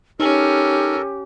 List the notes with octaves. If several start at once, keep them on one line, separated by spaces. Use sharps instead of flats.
C#4 D#4 G4 A4 A#4